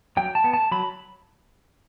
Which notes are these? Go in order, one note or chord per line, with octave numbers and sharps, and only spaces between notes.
F#3 G5
A5
B3
A5
F#3 B5